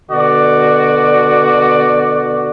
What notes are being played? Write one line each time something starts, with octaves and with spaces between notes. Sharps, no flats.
B2 D3 F#4 D5